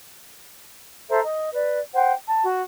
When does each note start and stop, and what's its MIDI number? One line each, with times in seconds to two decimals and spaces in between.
1.10 1.20 69
1.10 1.20 72
1.10 1.20 76
1.10 1.20 82
1.25 1.49 75
1.54 1.80 71
1.54 1.80 74
1.93 2.12 72
1.93 2.12 78
1.93 2.12 79
2.24 2.40 81
2.43 2.62 66